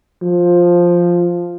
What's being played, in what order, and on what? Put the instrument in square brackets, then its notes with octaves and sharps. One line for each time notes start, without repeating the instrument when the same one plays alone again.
[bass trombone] F3